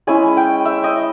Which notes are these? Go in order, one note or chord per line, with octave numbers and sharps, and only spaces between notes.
G#3 C#4 E4 G#5
G5
E5
D#5